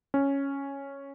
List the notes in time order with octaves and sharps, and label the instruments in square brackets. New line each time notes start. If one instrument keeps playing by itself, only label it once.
[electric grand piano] C#4